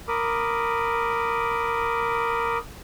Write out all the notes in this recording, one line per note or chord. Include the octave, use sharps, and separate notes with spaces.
A#4 B5 D6 D#6